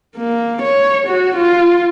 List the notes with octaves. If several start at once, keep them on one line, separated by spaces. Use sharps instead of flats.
A#3
C#5
F#4
F4